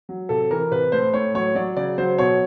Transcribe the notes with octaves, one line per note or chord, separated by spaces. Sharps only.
F#3
C3 A4
E3 A#4
C3 B4
A2 C5
A2 C#5
F#3 C#5
F#3 D5
C#3 D5
F#3 C5
B2 C#5